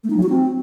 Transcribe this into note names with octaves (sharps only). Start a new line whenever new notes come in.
A3
D#4
F#3
F#4
C4